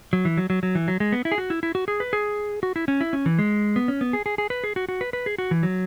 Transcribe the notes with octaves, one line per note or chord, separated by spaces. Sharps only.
F#3
E3
F#3
F#3
F#3
E3
F#3
G#3
B3
E4
G#4
F#4
E4
E4
F#4
G#4
B4
G#4
F#4
E4
C#4
E4
C#4
E3
G#3
B3
C#4
B3
G#4
G#4
G#4
B4
G#4
F#4
F#4
B4
B4
G#4
F#4
E3
F#3